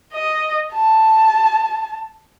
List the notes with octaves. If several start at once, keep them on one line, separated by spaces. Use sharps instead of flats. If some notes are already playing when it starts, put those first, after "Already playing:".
D#5
A5